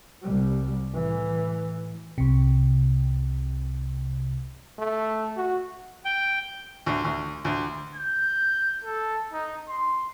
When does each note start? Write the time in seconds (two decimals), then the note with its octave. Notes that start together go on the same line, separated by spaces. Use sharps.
0.23 C2 G3
0.90 A2 E3
2.18 C2 C3
4.78 A3
5.36 F#4
6.05 G5
6.86 D2
7.04 D2
7.45 D2
7.95 G6
8.84 A4
9.33 D#4
9.69 C6